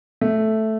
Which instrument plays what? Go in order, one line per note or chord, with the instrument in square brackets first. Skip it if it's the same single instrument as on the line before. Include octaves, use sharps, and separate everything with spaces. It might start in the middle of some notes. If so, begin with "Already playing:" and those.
[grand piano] A3